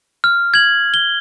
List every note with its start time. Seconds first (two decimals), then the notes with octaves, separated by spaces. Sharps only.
0.24 F6
0.54 G#6 F#7
0.94 G7